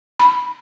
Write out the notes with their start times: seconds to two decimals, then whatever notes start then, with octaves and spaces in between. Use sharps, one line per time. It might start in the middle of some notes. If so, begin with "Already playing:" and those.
0.19 B5